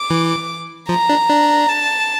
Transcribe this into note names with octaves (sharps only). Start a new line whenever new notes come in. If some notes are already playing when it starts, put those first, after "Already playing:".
Already playing: D6
E3
F3 A#5
D4
D4
A5